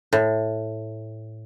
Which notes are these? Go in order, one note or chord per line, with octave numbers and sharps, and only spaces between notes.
A2